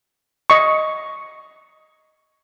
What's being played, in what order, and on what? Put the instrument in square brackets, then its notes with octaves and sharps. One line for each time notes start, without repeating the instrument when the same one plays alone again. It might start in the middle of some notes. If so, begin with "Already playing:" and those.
[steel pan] D#5 C#6